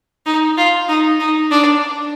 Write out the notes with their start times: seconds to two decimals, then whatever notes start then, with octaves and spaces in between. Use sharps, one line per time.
0.26 D#4
0.57 F4
0.88 D#4
1.20 D#4
1.51 D4